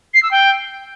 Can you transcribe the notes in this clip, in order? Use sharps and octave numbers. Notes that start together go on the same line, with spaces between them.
C7
E6
G5